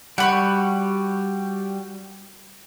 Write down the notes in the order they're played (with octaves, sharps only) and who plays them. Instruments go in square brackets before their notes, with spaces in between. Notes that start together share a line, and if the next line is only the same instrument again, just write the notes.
[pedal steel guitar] G3 [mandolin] F#4 B5 C#6